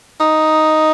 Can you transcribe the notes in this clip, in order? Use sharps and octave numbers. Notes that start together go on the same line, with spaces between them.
D#4